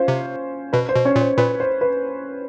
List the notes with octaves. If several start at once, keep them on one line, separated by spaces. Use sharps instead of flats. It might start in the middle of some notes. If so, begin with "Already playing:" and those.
Already playing: C#4 F4 C5
C3
B2 B4
C5
B2
C#4 C#5
A#2
C5
A#2 B4
C5
B4